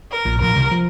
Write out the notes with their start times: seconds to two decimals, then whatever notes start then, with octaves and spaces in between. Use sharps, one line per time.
0.11 A#4
0.25 A#1 A#2
0.41 A#1 A#2 A#4
0.56 C2 C3
0.71 F3